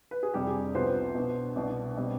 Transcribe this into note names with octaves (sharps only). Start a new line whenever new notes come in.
B4
G#4
F2 C3 G3 D4 G4
G#4
C2 C3 F3 B3 C5
B2 B3 D4
C2 B2 B3 D4 D5
B2 G3 C4